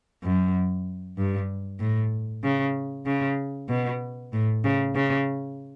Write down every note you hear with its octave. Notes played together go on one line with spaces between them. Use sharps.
F#2
G2
A2
C#3
C#3
B2
A2
C#3
C#3